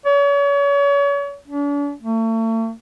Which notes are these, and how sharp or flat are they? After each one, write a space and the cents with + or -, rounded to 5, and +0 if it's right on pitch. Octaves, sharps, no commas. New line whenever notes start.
C#5 +35
D4 -40
A3 +40